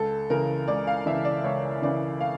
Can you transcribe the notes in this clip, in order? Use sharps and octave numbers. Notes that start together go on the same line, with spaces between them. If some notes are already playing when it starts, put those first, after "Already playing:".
Already playing: C#2 A4
C#3 E3 A#4
C#2 D5
F5
C#3 E3 E5
D5
C#2 C#5
C#3 E3 D5
F5